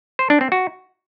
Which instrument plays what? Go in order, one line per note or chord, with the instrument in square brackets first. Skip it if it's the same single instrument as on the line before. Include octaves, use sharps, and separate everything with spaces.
[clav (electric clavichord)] C5
D4
C4
F#4